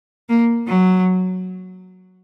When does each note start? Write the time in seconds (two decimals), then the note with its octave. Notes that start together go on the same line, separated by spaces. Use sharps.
0.29 A#3
0.68 F#3